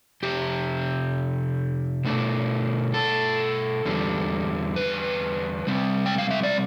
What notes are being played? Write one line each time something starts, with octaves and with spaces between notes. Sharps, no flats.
F2 C3 G4
B2 A3 D4
A4
E2 D3 G3
B4
C3 G3 C4
G5
F5
E5
D5